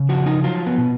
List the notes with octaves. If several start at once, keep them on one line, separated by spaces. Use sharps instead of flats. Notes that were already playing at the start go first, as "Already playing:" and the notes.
Already playing: C#3
F3 F#4
D#4
F#3 F4
B3
B2